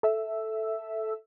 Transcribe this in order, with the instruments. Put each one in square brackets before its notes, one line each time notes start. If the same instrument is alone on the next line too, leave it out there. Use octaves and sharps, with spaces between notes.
[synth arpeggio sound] A4 E5 E6